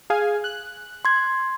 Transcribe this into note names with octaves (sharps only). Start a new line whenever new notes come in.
G#4 F5 G#5
F#6
C6 G#6